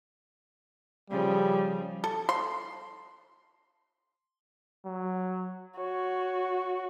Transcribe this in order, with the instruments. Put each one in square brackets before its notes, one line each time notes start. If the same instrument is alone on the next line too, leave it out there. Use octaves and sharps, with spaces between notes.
[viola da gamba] C#3 F3 [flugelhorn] G3
[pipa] A4
C6
[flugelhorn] F#3
[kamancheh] F#4 [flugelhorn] C#5